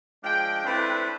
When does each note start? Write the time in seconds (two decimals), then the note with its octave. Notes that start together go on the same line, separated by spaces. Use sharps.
0.24 F3 G#3 D4 G5
0.65 A3 C4 D4 E4 B4